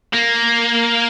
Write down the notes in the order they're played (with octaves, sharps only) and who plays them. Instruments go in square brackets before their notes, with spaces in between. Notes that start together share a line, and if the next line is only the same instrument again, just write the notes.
[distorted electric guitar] A#3